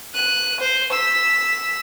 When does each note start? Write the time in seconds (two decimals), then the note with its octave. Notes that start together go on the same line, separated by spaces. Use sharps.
0.14 F#6 D#7
0.60 C5
0.92 E6 B6